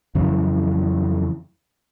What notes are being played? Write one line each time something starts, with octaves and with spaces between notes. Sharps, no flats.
F2 C#3 E3 F#3